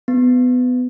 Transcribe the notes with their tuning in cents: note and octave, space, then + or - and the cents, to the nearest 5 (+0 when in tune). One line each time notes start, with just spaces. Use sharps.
B3 +20